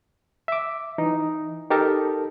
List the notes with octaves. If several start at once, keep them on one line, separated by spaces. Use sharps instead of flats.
E5 D6
E3 D#4
D#4 G4 A4 A#4 A5